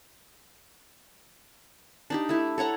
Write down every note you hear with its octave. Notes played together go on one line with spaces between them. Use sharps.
D4 D#4 G4
A3 E4
A4 C#5 F#5 A#5